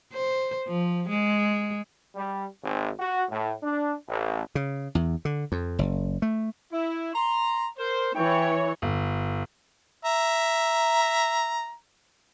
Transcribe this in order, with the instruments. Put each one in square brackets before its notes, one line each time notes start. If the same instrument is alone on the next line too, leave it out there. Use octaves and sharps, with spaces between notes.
[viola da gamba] C5
F3
G#3
[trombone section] G3
G#1
F#4
A2
D4
A1
[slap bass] C#3
E2
D3
F2
F#1
A3
[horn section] E4
A#5 C6
A#4 C5
[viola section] E3 C#5 [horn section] G5
[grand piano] G1
[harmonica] E5 A#5